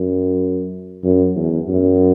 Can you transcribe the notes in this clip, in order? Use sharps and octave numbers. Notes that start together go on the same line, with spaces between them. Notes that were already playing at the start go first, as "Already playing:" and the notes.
Already playing: F#2
F#2
E2
F#2